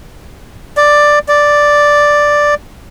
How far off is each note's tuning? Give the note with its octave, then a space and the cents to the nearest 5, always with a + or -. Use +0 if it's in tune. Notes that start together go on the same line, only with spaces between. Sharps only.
D5 +5
D5 +0